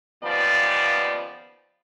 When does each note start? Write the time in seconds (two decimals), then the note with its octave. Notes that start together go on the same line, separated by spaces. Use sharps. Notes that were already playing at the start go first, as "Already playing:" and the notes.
0.23 D#2 C#3 F3 B3 D5